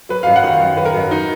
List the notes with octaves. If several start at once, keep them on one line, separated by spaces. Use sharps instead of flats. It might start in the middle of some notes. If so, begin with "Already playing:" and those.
F#3 B4
F#2 F5
F#5
D#3 F5
F#2
F#3 B4
A#4
F#2
F#3 D#4